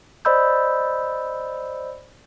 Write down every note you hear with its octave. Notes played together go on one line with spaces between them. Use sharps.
C5 D5 D#5 B5 E6 G6